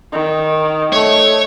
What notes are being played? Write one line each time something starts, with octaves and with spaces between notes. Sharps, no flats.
D#3
A3 C#5